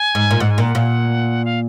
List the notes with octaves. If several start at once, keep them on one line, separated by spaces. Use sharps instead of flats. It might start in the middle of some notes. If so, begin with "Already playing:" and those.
Already playing: G#5
G#2
A#2
G#2 F#5
G#5
A#2 F#5
A#2
F5